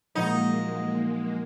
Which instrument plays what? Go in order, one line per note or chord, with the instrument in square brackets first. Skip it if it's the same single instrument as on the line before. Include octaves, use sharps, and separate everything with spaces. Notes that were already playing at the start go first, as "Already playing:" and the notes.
[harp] A#2 F3 F#3 [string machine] G#3 A#3 [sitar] D#4